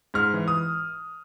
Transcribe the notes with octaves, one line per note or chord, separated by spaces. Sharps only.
G#2 F6
E3
D#6